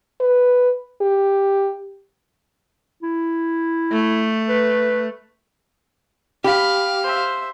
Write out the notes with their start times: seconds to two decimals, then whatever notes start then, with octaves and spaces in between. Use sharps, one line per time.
0.20 B4
1.01 G4
3.03 E4
3.92 A3
4.49 B4
6.44 G4 F5 B5
7.03 C5 E5